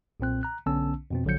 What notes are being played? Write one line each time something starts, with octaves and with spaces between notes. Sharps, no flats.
B1 A#2 C4 F#6
A#5 F#6
B1 D3 B3 C#4 A5 E6
F2 B2 C4
A#1 D3 F3 F#3 G6 C#7